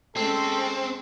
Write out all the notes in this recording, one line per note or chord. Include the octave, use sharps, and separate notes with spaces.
G#3 C4 C#4 A4